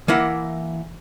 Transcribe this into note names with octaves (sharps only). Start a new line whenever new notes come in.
E3 A#3 E4 F#5